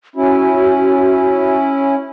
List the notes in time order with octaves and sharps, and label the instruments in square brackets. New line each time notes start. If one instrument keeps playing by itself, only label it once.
[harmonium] C#4 E4 [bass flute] F#4